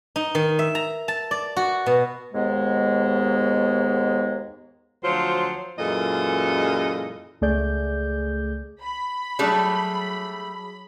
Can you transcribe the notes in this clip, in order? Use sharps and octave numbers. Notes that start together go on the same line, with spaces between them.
D#4
D#3
E5
A#5
A5
D5
F#4
B2
D#2 G#2 G#3 B3
D2 F3 F#3 F4 C5
F#2 A#2 E3 G#3 A4 D#5
C#2 A3 G#4 D5 G6
B5
F#3 G3 A3 D4 G#4